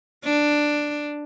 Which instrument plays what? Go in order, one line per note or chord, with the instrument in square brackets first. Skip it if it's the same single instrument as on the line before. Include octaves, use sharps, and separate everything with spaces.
[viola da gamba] D4